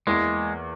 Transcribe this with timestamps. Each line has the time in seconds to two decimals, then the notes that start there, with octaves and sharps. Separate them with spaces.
0.07 E2 E3 G#3 A#3